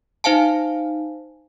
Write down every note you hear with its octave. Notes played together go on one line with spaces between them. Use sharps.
D#4 C5 F5 G#5 A5